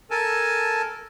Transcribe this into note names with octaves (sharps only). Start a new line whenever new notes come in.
A4 A#4 G#5 A5